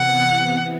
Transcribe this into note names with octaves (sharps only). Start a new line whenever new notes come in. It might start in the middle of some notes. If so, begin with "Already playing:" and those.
Already playing: C3 E3 B3 F#5